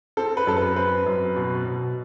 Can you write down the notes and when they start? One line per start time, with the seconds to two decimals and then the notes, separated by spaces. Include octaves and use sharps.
0.17 C4 A4
0.37 B4
0.47 F#2 A4
0.57 B4
0.76 C4 B4
1.06 F#2
1.36 B2
1.66 B2